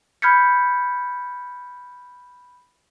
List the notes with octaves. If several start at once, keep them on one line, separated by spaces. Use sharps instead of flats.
B5 F6 G6 G#6 B6 C#7